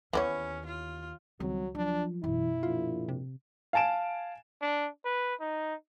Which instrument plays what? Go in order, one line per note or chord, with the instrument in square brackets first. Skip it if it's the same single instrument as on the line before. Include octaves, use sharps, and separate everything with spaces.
[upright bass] D#2 [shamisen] E3 B3 C#5 [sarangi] C#4
[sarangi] F4
[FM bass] C#2 [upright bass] D#3 C4 [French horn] F#3 [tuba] G3
[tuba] F3 [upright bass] F#3 [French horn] D4
[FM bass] G#1 [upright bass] F#2 B2 [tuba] E3 [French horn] E4
[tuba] A#1 [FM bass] F4
[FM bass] C3
[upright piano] F5 G#5 A5 D7 E7
[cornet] D4
B4
D#4